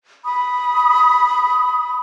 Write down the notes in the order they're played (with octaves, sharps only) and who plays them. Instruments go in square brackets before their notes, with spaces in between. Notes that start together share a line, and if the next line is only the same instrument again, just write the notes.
[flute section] B5 D#6